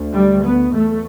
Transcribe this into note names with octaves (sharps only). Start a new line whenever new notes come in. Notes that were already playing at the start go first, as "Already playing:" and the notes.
Already playing: D2
G3
B3
E2 A3